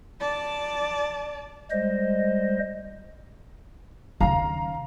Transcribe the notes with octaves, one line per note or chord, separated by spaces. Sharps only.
D5 A5
G3 G#3 C5 D#5
D#2 C#3 F5 A#5